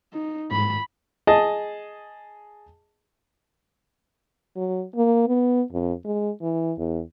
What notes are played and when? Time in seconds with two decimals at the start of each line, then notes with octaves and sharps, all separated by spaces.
0.13 D#4
0.51 G#2 B5
1.27 G#4 D#5 A5
4.57 F#3
4.96 A#3
5.28 B3
5.73 F2
6.05 G#3
6.42 E3
6.78 E2